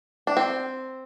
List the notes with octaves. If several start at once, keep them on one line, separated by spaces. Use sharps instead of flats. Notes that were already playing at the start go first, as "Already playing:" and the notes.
D4
C4